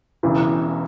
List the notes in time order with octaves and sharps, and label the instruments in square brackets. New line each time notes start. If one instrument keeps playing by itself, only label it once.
[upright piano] E1 E2 C#3 E3